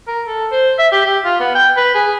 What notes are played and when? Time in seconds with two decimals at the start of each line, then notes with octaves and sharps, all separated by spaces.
0.07 A#4
0.27 A4
0.51 C5
0.78 E5
0.92 G4
1.05 G4
1.25 F4
1.40 B3
1.55 G5
1.76 B4
1.94 G#4